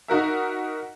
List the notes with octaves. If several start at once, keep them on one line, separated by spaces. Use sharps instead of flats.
D#4 F#4 A#4 E5